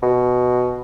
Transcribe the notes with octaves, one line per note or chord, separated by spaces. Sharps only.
B2